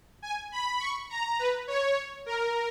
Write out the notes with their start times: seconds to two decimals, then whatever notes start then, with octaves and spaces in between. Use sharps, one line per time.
0.22 G#5
0.52 B5
0.80 C#6
1.10 A#5
1.39 B4
1.68 C#5
2.26 A#4